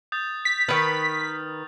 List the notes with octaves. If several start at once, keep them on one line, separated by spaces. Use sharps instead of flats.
D#6 G6 A6
B6
D#3 B4 F6